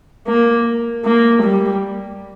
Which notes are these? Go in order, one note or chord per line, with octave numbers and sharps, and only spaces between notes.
A#3
A#3
G3